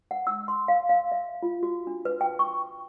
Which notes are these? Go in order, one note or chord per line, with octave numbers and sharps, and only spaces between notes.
F#5
E6
C6
F5
F5
E5
F4
F#4
D4
B4
G5
C#6